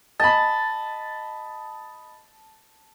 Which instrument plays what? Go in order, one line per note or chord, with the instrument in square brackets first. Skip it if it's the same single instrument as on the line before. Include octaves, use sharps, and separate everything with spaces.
[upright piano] D#5 B5 [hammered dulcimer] A5